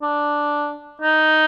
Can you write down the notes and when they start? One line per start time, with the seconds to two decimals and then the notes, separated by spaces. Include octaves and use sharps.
0.02 D4
1.02 D#4